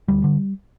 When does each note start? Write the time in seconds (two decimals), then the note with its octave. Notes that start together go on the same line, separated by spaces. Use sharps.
0.08 D2 G3
0.24 D3